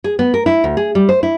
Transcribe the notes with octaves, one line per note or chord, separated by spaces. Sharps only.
G#4
B3
A#4
E4
D2
G#4
G3
C5
E4